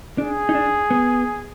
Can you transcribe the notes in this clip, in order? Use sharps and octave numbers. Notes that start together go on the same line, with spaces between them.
D4 G#4
D#4
D4
B3